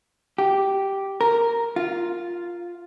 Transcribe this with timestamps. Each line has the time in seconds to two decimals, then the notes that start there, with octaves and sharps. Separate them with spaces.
0.38 G4
1.21 A#4
1.76 F4